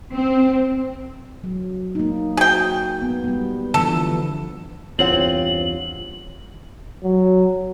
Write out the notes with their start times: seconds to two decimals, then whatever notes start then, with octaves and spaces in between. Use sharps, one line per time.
0.14 C4
1.44 F#3
1.95 A#3 D#4
2.37 F#4 G#4 G5
3.02 B3
3.24 G3 B3
3.74 D3 E3 F3 A4
4.99 E2 G2 C4 F4 C#5 F#5 F#7
7.03 F#3